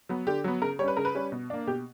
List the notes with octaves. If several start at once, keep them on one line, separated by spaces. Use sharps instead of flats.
F#3 B3
D3 G4
F#3 B3
C#3 A#4
G3 C#4 B4 C#5
C#3 A#4
B4
G3 C#4
B2
A#3 D4
B2 G4